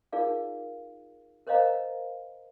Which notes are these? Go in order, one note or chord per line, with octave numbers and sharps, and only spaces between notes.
D#4 F4 G#4 A#4 D5 F5
A#4 C5 C#5 D#5 F5 A#5